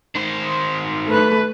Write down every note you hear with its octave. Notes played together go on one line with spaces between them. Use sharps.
D#3 C5
A3 B4